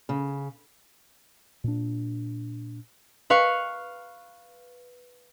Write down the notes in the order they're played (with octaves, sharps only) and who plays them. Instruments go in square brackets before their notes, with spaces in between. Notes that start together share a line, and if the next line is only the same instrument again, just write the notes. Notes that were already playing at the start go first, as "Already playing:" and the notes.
[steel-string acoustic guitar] C#3
[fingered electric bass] A#2 D4
[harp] B4 F5 C#6